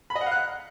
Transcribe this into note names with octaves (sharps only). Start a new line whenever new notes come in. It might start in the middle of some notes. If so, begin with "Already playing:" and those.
B5
D#5
F#5
F5
F#6